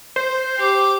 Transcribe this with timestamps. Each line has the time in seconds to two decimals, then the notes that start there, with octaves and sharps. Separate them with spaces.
0.16 C5
0.57 G4 D6